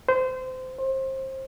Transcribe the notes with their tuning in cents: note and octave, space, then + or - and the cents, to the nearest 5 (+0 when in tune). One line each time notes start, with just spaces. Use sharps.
C5 -25
C5 +25